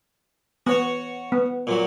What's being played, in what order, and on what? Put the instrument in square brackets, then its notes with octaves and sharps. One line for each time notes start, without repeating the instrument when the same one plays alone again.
[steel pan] B3 [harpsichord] F#4 C#5
[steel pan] B3
[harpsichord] A#2 F#3